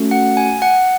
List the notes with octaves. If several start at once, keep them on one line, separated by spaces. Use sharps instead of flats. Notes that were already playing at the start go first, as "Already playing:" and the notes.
Already playing: A3 C#4 F#4 A4
F#5
G#5
F#5